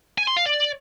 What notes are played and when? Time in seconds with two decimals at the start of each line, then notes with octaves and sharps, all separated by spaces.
0.18 G#5
0.27 C6
0.36 F5
0.46 D5